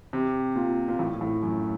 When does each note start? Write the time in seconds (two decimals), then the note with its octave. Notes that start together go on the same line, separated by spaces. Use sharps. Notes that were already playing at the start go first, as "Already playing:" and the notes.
0.13 C3
0.56 A#2
0.88 A#2
0.99 A2
1.21 A2
1.42 F#2